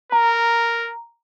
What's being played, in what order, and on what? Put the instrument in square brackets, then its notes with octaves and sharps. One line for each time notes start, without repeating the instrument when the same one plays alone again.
[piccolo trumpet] A#4 [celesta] A#5